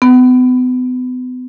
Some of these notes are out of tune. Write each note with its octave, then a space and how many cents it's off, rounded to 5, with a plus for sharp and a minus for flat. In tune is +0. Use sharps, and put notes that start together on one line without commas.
B3 +35